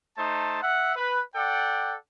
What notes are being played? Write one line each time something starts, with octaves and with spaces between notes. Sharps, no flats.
A3 D#4 C5 A5
E5 F#5
B4
A4 D5 F#5 G5